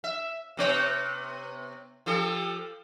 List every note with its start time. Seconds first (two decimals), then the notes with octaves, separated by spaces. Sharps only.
0.04 E5
0.57 C3 B3 C#5
2.06 F3 G4 A4